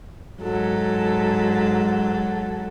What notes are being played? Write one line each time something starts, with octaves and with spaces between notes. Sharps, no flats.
G#2 F#3 A4